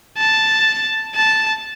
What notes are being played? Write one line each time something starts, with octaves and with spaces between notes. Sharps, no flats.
A5
A5